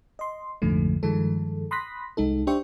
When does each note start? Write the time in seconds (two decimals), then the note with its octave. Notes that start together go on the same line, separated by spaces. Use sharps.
0.19 D#5 C6
0.62 A#1 F2 G#2 D3 F3 A3
1.03 G2 D#3 F3 G#3 A4
1.71 B5 C6 D#6 F#6 A#6 B6
2.17 C2 G#3 D#4 A4
2.47 D4 G4 C5 E5 G5 C#6